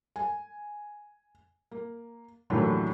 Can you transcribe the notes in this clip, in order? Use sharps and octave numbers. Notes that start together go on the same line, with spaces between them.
G#5
A#3
D#2 A2 D3 E3 F#3 A3